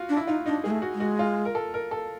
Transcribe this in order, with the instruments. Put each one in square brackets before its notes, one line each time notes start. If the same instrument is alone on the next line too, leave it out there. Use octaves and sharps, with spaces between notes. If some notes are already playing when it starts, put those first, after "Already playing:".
Already playing: [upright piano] F4 F#4
[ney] D4
[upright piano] E4
[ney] D#4 [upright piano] F4
[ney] D4 [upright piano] D#4
[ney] G#3 [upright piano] G#4
[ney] A3
[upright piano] F#4
[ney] G#3
[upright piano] F#4
F4
A#4
A4
A#4
A4